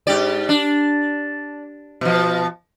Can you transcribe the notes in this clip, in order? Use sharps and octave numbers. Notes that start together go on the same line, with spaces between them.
G#2 G4 D5
D4
B2 F3